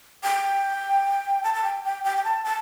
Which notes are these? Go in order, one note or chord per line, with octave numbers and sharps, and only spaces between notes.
G5
A5
A5
G5
G5
G5
G5
A5
A5